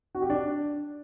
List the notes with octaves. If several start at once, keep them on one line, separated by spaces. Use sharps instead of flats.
F#4
G4
D4